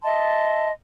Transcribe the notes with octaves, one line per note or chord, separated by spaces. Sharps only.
D#5 E5 A5 C6